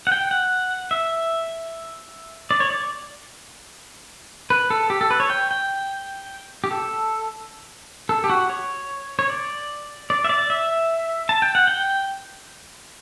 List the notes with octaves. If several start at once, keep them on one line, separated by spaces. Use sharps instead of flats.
F#5
G5
F#5
E5
D5
C#5
D5
B4
A4
G4
A4
B4
C#5
G5
G5
G4
A4
A4
G4
F#4
C#5
C#5
D5
D5
E5
D5
E5
A5
G5
F#5
G5